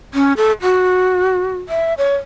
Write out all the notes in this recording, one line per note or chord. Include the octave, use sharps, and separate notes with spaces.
C#4
A4
F#4
E5
C#5